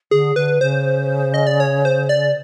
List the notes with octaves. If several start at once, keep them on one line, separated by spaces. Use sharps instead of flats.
D3 G#4
D3 B4
C#3 C5
D#5
D5
C#5
C5
D5